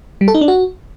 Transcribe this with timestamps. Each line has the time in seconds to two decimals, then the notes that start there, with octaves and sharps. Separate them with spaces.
0.21 G3
0.28 A4
0.34 D#4
0.41 D4
0.48 F#4